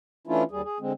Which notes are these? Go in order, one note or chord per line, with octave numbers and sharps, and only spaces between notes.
E3 A3 C#4 D4 E4 F4
D#2 G3 G#4
G#4
D3 G#3 C4